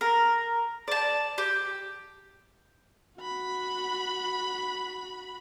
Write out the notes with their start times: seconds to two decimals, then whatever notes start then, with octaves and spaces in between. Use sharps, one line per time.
0.01 A#4
0.88 D5 A5
1.38 G4
3.19 F#4 B5